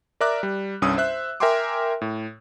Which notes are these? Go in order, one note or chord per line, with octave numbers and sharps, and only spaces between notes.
A#4 D5 E5 A#5 D6 F#6
G3
C2 G2 C#4 D#6 E6
C5 E5 F#6
A#4 E5 G5 G#5 C6 D6
A2